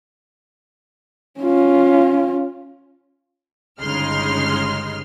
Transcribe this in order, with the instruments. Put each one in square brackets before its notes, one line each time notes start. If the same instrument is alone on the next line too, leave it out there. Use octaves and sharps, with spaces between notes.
[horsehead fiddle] C#4 F4
[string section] G1 C#3 G#3 D#4 C6 F6